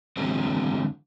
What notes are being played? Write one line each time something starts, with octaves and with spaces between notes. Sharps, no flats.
D3 E3 F#3 G#3 C4